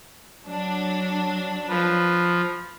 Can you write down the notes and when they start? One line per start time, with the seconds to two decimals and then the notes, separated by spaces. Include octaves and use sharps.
0.45 F#3 D4
1.69 F3 B4